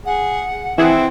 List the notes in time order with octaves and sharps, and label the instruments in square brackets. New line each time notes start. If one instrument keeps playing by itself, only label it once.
[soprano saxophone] G#4 [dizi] F#5
[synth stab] E3 G#4 F#5 [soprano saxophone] C4 [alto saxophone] E4